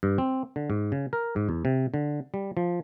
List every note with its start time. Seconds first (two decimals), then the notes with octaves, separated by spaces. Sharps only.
0.03 G2
0.18 C4
0.56 D3
0.70 G#2
0.92 C#3
1.13 A#4
1.36 G#2
1.49 E2
1.65 C3
1.94 D3
2.34 G3
2.57 F3